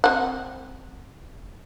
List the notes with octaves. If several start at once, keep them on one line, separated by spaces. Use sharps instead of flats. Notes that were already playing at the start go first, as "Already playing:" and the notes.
C4 F#5